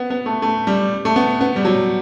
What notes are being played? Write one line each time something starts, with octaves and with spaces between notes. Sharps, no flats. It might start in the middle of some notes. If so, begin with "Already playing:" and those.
Already playing: B3
B3
A3
A3
G3
A3
B3
B3
G3
F#3